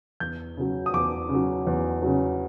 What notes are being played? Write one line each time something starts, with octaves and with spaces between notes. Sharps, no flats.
E2 G6
C#3 F#3
D#6
E2 D6
C#3
F#3
E2
C#3 F#3